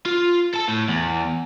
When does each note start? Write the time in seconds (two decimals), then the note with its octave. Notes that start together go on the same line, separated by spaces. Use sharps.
0.06 F4
0.54 A4 A5
0.68 A2
0.88 E2